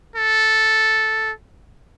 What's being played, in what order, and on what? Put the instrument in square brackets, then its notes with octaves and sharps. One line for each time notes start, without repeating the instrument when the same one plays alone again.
[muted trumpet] A4